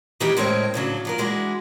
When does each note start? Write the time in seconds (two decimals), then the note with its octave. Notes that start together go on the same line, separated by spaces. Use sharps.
0.20 D#3 E3 G#3 E4 G4 G#4
0.37 A2 G#3 C4 A#4 C#5
0.74 A2 C#3 F#3 D4
1.05 F3 F#3 A#4
1.18 E3 G#3 D4 E4 F#4